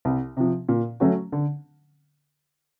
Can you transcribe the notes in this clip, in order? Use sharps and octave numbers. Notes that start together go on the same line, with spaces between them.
C2
C3 F3
A#2
F#3 A3 C#4 F#4
D3